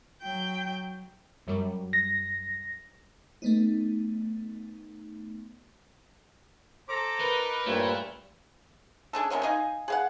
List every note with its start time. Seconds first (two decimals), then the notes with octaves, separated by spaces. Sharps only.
0.23 F#3 G5
1.47 F#2 F#3 G3
1.93 A#6
3.42 A3 B3 D#4
6.89 A4 C5 A#5 D6
7.20 D#4 A#4 B4
7.66 G2 A#2 A3 E4 C5 C#5
9.13 C#4 D4 G#4 A4
9.30 C3 G#3 A#3 C#4
9.43 D#4 D#5 F5 G#5
9.88 G#4 F5 F#5